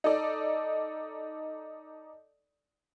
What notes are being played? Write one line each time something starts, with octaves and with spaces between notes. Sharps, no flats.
D#4 A4 D5